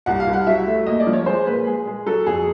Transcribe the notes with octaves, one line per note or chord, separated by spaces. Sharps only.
C2 F#5
F5
C2
F#5
F#3 E5
A3
D#2 D#5
D5
F3
C#5
G#3 C5
A#2 B4
G#3 G#4
G#3
F#3 A4
F2 G#4